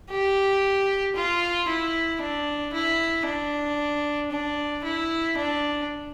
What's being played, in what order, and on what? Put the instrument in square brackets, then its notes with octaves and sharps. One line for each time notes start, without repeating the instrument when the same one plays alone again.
[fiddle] G4
F4
E4
D4
E4
D4
D4
E4
D4